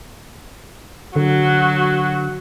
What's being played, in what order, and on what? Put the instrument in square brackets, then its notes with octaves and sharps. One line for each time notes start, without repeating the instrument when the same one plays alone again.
[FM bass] D3 [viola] F#3 F#4